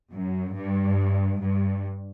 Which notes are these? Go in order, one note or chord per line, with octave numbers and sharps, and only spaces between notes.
F#2
G2
G2